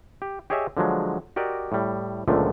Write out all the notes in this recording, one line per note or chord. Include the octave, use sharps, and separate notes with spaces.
G4
G4 G#4 C#5 D#5 E5 G#5
D3 F3 F#3 G#3
F#4 G4 A#4 D5 D#5
A2 G3
C#2 A#2 D3 F3 A3